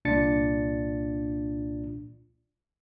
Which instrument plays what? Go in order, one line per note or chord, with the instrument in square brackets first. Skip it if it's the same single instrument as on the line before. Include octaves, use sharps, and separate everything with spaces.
[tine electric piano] C2 A#2 D4 F4 A6 C#7